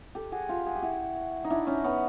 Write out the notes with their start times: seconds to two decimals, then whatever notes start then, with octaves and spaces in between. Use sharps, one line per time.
0.15 G4 A4
0.32 F#4 G#4
0.49 F4 G4
0.66 F#4 G#4
0.75 G4
0.82 E4 F#4
1.44 D#4
1.50 D4 E4
1.67 C#4 D#4
1.84 B3 C#4